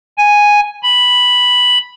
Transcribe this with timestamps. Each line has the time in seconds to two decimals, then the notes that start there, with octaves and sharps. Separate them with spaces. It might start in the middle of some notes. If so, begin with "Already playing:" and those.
0.18 G#5
0.83 B5